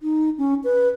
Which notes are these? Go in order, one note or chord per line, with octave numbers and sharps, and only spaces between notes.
D#4
C#4
B4